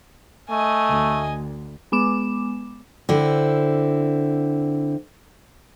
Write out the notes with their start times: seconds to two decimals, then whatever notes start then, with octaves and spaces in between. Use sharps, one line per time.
0.50 A3 D#5 G#5
0.88 D2
1.92 G#3 B3 D6 E7
3.09 D3 C4 E4